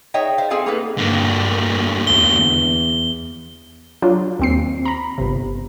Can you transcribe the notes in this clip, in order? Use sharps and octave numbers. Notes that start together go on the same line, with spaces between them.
D#4 G#4 C#5 D#5 E5 G5
C5 E5 F5
C4 G#4 A4 F5 G#5
A#3 B3 D#4 G#4 A4 B4
G2 D3 A#3
E2 G7
F#3 D4 F4
D#2 C4 C7
A#5 B5
G1 C3